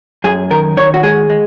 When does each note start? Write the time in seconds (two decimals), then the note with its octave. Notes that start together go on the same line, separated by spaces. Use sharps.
0.24 F#2 G#4
0.51 D#3 A#4
0.77 D#3 C#5
0.94 F#4
1.03 G#3 G#4
1.30 G#3